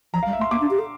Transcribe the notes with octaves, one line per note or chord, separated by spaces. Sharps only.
F3 A#5
F5
G3
E5
A3
C6
A#3 D6
D4
G4
A4